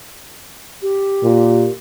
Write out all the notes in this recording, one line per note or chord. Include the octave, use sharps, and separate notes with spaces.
G4
A#2